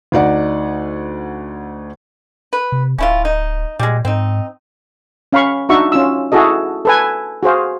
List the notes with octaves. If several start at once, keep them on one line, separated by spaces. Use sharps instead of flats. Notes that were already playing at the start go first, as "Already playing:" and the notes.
D2 D#4 D5 F#5
B4
C3
D1 C#4 E4 F4
D#4
A#2 G3 G#3
G#2 C4 D#4
C#4 F5 B5 C#6
D4 D#4 F#4 E5 C#6
C#4 F4 E6
E4 F#4 G#4 A4 D#5
A4 B4 G#5
F#4 G#4 C5 F5